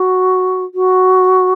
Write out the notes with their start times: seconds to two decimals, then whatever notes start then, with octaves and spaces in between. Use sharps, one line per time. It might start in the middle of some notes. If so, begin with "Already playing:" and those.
Already playing: F#4
0.74 F#4